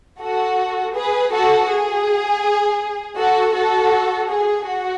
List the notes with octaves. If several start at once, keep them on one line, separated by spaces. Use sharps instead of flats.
F#4 A4
G#4 B4
F#4 A4
G#4
F#4 A4
F#4 A4
G#4
F#4